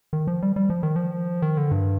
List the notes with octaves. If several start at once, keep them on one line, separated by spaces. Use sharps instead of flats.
D#3
F3
G3
G3
F3
D#3
F3
D#3
D3
G2